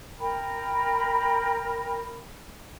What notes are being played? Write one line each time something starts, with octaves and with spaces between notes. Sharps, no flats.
A#4 G5 A#5 B5